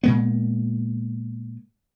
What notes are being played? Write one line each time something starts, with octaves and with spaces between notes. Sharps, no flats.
A#2 G#3 B3